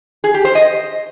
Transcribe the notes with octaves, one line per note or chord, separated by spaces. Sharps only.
G#4
G4
C5
D#5